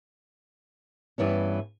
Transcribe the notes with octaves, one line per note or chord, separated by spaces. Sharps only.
G2 E3 B3 C#4